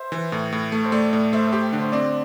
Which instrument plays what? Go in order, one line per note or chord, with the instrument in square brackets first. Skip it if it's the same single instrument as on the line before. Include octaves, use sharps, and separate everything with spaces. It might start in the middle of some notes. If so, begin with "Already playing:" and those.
Already playing: [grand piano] C5 E5
[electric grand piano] E3
A2
A2
A3
[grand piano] C5
[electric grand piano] A3 [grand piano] D5
[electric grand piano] A2 [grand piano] D5
[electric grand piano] A3 [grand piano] C5 E5
[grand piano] C5
[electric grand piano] G4
D3
[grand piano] C5
[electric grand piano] C4 [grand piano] D5